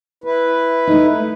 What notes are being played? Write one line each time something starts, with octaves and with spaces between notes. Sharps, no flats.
E4 B4
A3 D#4